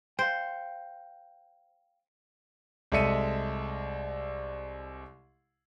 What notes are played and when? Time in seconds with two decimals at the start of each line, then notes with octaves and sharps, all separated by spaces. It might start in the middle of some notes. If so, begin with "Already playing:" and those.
0.19 C5 F5 G5
2.92 C2 G#3 A4 E5 C#7 D#7